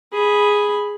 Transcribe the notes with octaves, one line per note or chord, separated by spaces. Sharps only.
G#4 B5